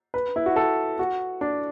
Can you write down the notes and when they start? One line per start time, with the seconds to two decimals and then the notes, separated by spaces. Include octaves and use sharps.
0.14 B4
0.36 E4
0.46 F#4
0.56 A4
0.99 F#4
1.41 D4